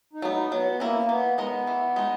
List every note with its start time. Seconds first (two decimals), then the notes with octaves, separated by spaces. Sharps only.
0.13 D#4
0.22 F#3 B3
0.32 D#4
0.51 F#3 B3
0.80 A#3 C#4 E4 A#4
1.09 E3 B3
1.38 G#3 B3 D#4 A#4 D#5
1.67 E3
1.96 G#3 D#4